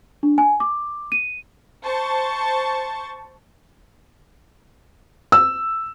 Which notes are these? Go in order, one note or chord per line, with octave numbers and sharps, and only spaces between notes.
D4
G#5
D6
D#7
C5 A5 C#6
E6